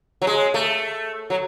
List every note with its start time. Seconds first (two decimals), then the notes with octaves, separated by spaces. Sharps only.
0.22 F#3
0.27 G#3
0.54 A3
1.30 F#3